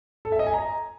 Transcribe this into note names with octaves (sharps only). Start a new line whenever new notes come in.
A4
E5
D#5
G#5
A#5